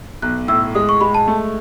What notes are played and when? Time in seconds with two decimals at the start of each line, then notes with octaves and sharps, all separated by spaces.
0.22 B1 F#6
0.48 A2 E6
0.75 G#3 D#6
0.89 C#6
1.01 G#3 B5
1.14 A5
1.27 A3